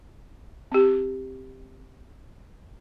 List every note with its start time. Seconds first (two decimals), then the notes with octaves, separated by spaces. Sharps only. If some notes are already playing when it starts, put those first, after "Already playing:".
0.72 C4 G4